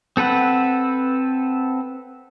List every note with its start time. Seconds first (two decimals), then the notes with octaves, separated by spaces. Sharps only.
0.17 C4 A4 B4 F#5